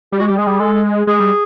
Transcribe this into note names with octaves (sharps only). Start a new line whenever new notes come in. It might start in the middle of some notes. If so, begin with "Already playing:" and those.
G3 G4
G#3 F#4
G3 G4
G#3 G#4
G3
G#3 A4
G#3 G#4
G3